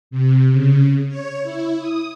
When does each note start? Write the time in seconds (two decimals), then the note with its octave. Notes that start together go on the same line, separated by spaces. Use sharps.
0.11 C3
0.53 C#3
1.08 C#5
1.43 E4
1.80 D#6